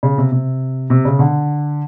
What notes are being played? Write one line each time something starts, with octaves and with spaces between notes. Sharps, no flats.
C#3
C3
C3
C3
C#3
D3